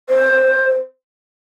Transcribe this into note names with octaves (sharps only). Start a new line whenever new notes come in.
C5